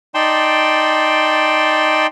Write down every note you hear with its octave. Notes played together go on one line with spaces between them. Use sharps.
D#4 D5 G5 A5 C6